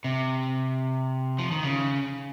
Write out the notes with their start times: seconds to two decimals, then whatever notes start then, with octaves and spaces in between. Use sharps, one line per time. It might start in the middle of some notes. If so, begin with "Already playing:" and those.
0.04 C3
1.38 F3
1.51 D#3
1.63 C#3